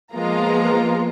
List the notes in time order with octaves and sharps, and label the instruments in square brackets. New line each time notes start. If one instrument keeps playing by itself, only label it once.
[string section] F3 G#3 A#3 B3 F4 A#5